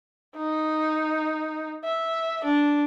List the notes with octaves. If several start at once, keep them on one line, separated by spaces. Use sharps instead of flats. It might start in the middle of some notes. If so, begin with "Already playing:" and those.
D#4
E5
D4